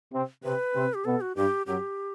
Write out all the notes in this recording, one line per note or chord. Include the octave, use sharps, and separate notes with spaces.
C3 C4
C3 C4 B4
C3 C4
G4
B2 B3 A4
F#4
G2 G3 G4
F#2 F#3 G4